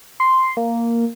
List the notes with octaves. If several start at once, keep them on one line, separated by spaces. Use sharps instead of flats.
C6
A#3